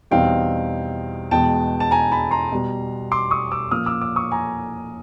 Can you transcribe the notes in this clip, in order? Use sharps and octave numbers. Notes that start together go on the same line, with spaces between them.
E2 B2 G3 C4 D#4 F5 G5
E2 B2 G#3 B3 G5 A5
A5
G#5 A#5
A5 B5
A#5 C6
B2 G3 B3
C6 D6
C#6 D#6
D6 E6
A#2 F3 A#3 C#4 D#6 F6
D6 E6
D6 E6
C#6 D#6
G#5 A#5